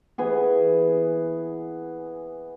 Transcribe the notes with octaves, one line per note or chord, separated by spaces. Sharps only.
E3 B3 G#4